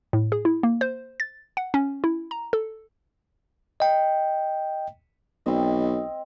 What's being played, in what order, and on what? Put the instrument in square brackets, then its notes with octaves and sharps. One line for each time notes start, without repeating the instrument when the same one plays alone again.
[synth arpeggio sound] A2
G#4
E4
A#3
C5
A6
F#5
C#4
E4
A#5
A4
[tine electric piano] D#5 G5
[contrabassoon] B1 [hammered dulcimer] C4 D#5